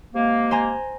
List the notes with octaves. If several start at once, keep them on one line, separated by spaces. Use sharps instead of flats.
C3 G#3 A#3
C5 G#5 A#5